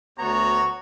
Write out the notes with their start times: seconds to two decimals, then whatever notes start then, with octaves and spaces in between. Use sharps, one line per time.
0.18 D2 B3 F#4 C#5 A#5